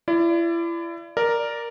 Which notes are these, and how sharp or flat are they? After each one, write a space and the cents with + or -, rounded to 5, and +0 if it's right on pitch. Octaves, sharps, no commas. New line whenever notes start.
E4 +35 D5 +0
A#4 +0 D5 +0